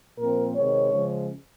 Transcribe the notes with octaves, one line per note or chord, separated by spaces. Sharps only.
A#2 F3 C4 A#4
C3 D#3 G#3 C4 C#5
C#3 F3 G#3